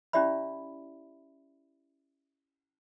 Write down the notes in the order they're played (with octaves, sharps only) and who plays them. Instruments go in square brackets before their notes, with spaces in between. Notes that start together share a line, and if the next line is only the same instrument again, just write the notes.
[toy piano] C#4 E4 G4 D5 E5 B5